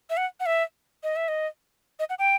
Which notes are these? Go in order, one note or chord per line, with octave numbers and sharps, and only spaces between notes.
E5
F#5
F#5
E5
D#5
E5
D#5
D#5
F#5
G5